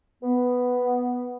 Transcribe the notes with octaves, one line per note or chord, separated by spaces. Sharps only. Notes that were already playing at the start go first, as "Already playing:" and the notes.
B3